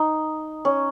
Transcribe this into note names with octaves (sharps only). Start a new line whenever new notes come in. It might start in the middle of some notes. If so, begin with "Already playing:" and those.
Already playing: D#4
C#4